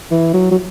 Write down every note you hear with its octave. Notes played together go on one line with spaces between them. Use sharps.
E3
F#3
F#3